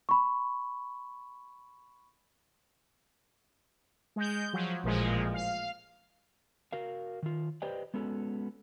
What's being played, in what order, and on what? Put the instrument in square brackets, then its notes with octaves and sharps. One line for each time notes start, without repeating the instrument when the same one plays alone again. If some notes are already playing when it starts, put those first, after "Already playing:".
[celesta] B5 C#6
[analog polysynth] G#3 G6
F3 F#3
A1 A#2 F3 G#3
F5
[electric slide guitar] F#4 A#4 F5
D#3 F4
G4 B4 C5 D5 D#5 G5
G#3 B3 C#4 F#4 A4